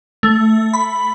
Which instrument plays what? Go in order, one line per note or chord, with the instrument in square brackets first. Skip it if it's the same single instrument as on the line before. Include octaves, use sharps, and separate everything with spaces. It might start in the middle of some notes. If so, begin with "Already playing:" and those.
[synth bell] A3
B5